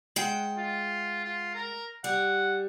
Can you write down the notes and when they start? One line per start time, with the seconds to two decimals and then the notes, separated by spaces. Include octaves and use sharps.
0.16 G#3 F#5 G5
0.57 F4
1.25 F4
1.55 A#4
2.04 G3 F#5